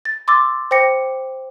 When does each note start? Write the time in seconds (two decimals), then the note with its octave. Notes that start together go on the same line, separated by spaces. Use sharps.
0.05 A6
0.28 C6 D6 E6 A6
0.71 C5 G5 D6 A#6 C#7